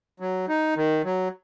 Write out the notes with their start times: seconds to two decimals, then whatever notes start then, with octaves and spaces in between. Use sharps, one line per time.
0.20 F#3
0.48 D#4
0.76 D#3
1.04 F#3